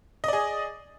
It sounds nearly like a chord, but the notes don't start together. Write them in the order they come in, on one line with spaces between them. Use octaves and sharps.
D#5 D5 G#4